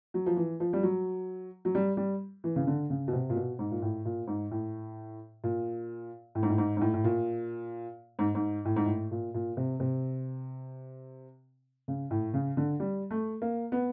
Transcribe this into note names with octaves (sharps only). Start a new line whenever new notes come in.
F#3
F3
E3
F3
G3
F#3
F#3
G3
G3
E3
C#3
D3
C#3
B2
C3
A#2
B2
G#2
A#2
A2
A#2
G#2
A2
A#2
A2
G#2
A2
G#2
G#2
A2
A2
A#2
G#2
G#2
A2
G#2
A2
A#2
A#2
C3
C3
C#3
A2
C#3
D3
G3
A3
A#3
B3